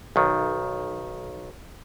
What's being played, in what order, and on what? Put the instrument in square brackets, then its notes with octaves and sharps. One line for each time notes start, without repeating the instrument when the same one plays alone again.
[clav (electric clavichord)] B1 D#3